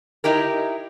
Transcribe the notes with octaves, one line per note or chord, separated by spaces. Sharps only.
D#4 E4 G4 A#4